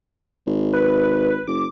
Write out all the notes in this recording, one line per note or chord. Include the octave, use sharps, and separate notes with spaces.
G#1
B4
F#1 D6